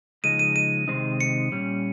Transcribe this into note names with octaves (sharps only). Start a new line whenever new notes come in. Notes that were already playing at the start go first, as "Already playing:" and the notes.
C#3 F3 G#3 D#4 D#7
D#7
D#7
C3 D#3 G#3 C4 D#4
C#7
A#2 G3 C#4